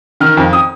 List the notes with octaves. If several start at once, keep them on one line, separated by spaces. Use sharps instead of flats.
D#3 F6
F2
D#6